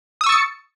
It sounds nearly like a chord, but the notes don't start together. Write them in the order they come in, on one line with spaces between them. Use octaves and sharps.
D#6 E6 C#6 A6 C#7